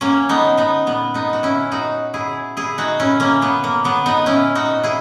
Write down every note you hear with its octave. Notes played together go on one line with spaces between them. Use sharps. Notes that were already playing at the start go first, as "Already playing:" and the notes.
F#3 A#3 C#4
B3 D#4
F#3
B3 D#4
A#2 B3
B3 D#4
A#2 F#4
C#4 E4
F#3 D#4 F#4
F#3 E4 G#4
A#2 E4 G#4
D#4 F#4
A#2 C#4 E4
A#3 C#4
F#3 B3
A#3
F#3 B3
B3 D#4
A#2 C#4 E4
D#4 F#4
A#2
E4 G#4